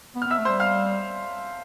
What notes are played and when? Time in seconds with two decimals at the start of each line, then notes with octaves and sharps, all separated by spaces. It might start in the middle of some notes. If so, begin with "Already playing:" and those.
0.15 B3
0.22 F6
0.26 B3 E5 E6
0.38 A3
0.45 G3 C5 C6
0.60 F5 F6